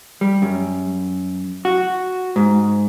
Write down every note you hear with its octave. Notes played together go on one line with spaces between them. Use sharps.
G3
F#2
F#4
G#2